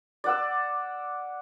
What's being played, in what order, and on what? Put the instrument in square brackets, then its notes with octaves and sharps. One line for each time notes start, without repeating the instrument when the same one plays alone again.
[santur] D5 F#5 E6